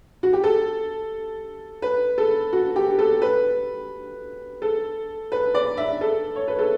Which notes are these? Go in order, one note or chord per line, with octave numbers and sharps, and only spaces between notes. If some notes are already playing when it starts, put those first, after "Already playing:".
F#4
G4
A4
B4
A4
F#4
G4
A4
B4
A4
B4
D5
E5
A4
C#5
B4
A4